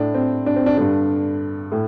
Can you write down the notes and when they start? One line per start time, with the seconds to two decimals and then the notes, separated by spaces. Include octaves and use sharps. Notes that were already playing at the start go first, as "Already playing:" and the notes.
Already playing: A2 D4
0.14 C4
0.46 D4
0.56 C4
0.66 D4
0.77 G2 D3 D4
1.72 A2